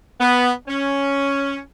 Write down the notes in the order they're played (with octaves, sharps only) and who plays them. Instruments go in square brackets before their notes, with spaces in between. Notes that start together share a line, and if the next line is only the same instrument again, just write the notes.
[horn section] B3
C#4